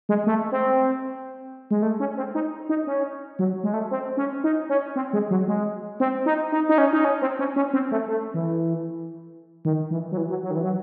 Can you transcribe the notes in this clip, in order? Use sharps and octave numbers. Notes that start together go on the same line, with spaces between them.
G#3
A3
C4
G#3
A3
C#4
C4
D#4
D#4
C#4
F#3
G#3
A3
C4
C#4
D#4
C#4
C4
G#3
F#3
G#3
C4
D#4
D#4
D#4
C#4
D#4
C#4
C4
C#4
C#4
C4
A3
A3
E3
D#3
E3
F#3
E3
F#3
F#3
D#3
E3
F#3